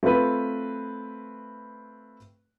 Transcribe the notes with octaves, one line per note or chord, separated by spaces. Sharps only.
A3 C4 F4 B4